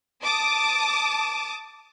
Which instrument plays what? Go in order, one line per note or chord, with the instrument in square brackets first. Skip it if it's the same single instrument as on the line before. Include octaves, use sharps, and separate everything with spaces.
[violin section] A5 D6 D#6